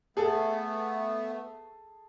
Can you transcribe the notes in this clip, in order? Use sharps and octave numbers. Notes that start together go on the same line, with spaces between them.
A3 B3 G#4 A4